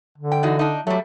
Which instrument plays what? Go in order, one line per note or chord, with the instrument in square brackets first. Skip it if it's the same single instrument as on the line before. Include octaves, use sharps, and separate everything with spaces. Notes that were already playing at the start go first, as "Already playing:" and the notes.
[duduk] D3
[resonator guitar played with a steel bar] G5
E3 D#4 F#4
D4 D#4
[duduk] F#3 [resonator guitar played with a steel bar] G3 A3